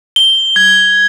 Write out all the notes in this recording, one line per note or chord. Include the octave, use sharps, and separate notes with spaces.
G7
G#6